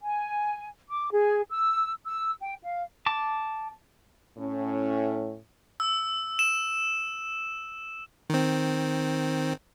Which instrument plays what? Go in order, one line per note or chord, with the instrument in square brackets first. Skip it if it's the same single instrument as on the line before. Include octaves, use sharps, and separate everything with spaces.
[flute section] G#5
D6
G#4
E6
E6
G5
F5
[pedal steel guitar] A5 D6
[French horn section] A2 C#4
[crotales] E6
E7
[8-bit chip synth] D#3 C4